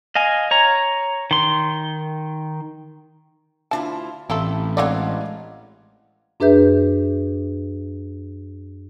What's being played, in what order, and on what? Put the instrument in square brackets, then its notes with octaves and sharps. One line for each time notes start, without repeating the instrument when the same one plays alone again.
[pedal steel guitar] D#5 F5 G#5
C#5 A#5
D#3 C6
[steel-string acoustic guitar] D2 E4 F4 [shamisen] D4 A5
[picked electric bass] A1 [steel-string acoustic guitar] A3 C4 G4 [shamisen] E4 F4 A4
[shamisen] D3 C4 C#5 [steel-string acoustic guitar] G#3 F5 [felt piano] D5 F#5
[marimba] F#2 D4 G#4 B4 E5 G6